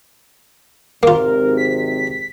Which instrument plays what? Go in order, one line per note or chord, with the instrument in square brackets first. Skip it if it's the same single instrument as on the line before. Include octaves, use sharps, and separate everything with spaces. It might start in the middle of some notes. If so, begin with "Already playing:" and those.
[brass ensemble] G#1 C3 [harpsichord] A#3 F4 [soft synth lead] A#4
[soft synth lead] B6